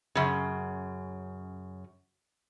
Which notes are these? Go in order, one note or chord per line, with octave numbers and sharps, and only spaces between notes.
F#2 C#3